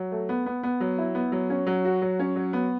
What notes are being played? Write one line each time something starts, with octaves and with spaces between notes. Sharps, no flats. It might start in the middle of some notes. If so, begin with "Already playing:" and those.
Already playing: F#3
A3
B3
B3
B3
F#3
E4
B3
F#3
C#4
F#3
F#4
F#3
C#4
F#3
B3